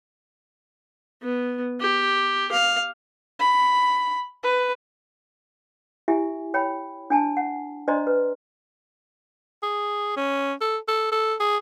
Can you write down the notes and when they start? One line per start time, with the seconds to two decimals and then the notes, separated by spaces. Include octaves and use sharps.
1.22 B3
1.80 G4
2.52 F5
3.39 B5
4.44 B4
6.08 E4 G4 E5 G#5
6.54 C#5 G5 B5
7.10 D4 G#5 A5
7.37 F#5
7.87 D4 C5 D5 D#5 A#5 C6
8.07 B4
9.63 G#4
10.17 C#4
10.61 A4
10.88 A4
11.12 A4
11.40 G#4